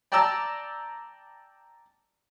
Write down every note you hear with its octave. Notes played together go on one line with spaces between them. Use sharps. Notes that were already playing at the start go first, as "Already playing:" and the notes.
D5 G5 A5 A#5 E6